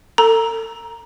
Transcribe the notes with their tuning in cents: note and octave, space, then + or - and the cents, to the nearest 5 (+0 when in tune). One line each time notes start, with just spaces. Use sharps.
A4 +35 A#5 +10 E6 +0